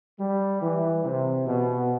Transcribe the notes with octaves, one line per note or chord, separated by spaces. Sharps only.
G3
E3
C3
B2